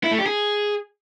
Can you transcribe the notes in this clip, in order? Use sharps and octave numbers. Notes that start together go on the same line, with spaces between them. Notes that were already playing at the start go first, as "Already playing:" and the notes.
E4
A3
G4
G#4